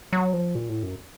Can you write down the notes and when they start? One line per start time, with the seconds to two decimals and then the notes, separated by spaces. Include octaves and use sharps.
0.13 F#3
0.33 F3
0.55 A#2
0.69 A2
0.83 F#2